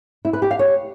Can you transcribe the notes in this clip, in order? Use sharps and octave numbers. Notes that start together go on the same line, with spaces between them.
E4
B4
G4
F5
C#5